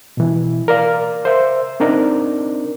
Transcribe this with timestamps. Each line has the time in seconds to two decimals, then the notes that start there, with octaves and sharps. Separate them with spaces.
0.17 B2 E3
0.68 A#4 D5 F5
1.25 C5 E5
1.80 C4 D4 D#4 A#4 D5